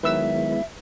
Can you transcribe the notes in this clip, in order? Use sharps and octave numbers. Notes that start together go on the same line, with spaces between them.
D#3 F#3 G#3 B3 E4 B4 E5 E6